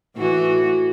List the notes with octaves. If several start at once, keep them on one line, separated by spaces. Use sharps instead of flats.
A2 E3 F#4